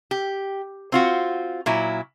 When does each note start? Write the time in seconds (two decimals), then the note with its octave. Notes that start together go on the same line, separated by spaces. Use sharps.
0.11 G4
0.92 C4 F4 F#4
1.66 A#2 F#3 E4